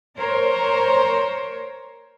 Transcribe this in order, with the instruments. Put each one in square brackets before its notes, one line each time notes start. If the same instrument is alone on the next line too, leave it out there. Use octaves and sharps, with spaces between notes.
[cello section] A#4 C5 C#5